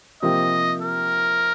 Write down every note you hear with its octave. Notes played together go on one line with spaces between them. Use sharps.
C3 F3 A#3 G4 D#5
A#4